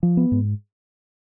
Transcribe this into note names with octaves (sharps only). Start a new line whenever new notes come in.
F3
B3
G#2